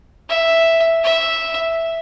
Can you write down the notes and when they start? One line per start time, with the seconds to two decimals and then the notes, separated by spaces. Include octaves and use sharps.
0.30 E5
1.04 E5